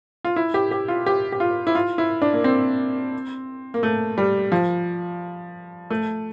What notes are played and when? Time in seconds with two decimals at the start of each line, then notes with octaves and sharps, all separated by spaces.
0.25 F4
0.36 E4
0.54 G4
0.71 G4
0.88 F4
1.06 G4
1.32 G4
1.40 F4
1.67 E4
1.75 F4
1.98 E4
2.22 D4
2.33 A#3
2.44 C4
3.74 A#3
3.83 A3
4.18 G3
4.52 F3
5.90 A3